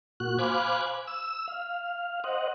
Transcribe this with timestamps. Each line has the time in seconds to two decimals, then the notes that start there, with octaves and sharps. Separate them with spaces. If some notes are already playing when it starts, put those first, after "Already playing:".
0.20 A#2 F#4 F#6
0.39 C5 F5 G#5 B5 D6 F#6
1.07 E6
1.48 F5
2.24 C5 D#5 F#5